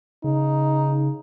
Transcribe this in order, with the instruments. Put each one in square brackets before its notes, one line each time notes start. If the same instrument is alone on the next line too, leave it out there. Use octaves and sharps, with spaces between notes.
[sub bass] C#3 [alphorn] D#4